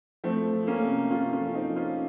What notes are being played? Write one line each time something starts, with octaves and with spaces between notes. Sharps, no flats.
F3 A3 C4
F3
A#3 C#4
C3
C3 C#4 F4
C#4 F4
F3
C4 D#4
F3
C#4 F4